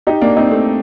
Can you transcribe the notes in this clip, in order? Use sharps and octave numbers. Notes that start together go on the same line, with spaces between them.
D#4 G4
A#3 D4
C4 D#4
A3 C4